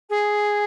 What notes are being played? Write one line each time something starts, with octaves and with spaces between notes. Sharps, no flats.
G#4